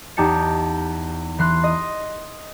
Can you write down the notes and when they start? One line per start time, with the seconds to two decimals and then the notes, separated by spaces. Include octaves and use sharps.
0.17 E2 D#4 G4 A5 C#7
1.39 E3 C6 F#6
1.64 D#5